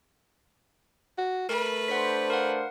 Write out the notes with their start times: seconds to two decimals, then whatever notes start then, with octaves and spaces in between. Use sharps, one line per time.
1.18 F#4
1.49 A3 A#4 B4
1.88 D4 C5 F#5 B6
2.30 A#4 F5 F#5